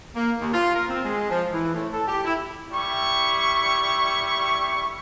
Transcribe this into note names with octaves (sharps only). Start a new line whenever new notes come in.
A#3
D#2
F4
A#4
C4
G#3
F3
E3
A2
A4
G4
E4
G3 E4 C#6